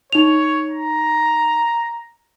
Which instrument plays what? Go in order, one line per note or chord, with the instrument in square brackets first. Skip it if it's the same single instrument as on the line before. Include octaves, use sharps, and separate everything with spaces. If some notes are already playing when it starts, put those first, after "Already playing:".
[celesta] D#4 F7 [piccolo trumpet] C#5
[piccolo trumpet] A#5